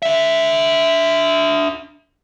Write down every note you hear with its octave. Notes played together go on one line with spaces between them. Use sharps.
D4 E5